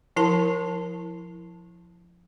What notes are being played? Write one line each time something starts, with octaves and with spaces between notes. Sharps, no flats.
F3 E4 A#4 A5